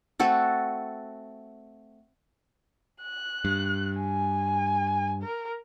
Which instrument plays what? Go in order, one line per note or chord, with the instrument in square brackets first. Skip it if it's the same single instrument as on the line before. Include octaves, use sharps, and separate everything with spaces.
[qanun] A3 C4 F#4 A4
[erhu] F#6
[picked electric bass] G2
[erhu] G#5
A#4